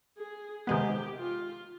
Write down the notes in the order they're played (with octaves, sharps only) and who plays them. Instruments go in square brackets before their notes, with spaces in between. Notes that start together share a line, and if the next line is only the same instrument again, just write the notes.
[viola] G#4
[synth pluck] C3 D#3 G#3 B3 [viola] G4
[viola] F4